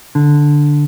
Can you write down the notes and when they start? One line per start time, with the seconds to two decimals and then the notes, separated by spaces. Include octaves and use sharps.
0.15 D3